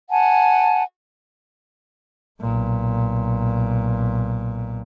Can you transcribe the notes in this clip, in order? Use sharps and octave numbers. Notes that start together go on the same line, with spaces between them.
F#5 G#5 A5
B1 A#2